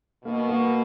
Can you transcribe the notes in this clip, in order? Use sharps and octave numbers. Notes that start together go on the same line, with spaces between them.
B2 A#3
A#3